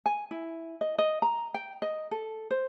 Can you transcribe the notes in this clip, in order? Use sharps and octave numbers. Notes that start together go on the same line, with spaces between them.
G#5
E4
D#5
D#5
A#5
G5
D#5
A4
C5